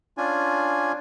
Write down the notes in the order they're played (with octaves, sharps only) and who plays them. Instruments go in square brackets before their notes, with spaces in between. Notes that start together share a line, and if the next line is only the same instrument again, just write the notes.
[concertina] C#4 D4 F4 G#5